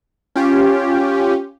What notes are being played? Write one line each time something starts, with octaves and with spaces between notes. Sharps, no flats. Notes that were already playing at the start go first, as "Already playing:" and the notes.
C#4 F4 G4